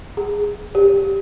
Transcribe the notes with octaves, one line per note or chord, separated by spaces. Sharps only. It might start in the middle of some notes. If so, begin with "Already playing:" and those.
G#4
G4